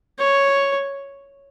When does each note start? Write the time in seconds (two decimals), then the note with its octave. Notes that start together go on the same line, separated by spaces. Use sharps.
0.19 C#5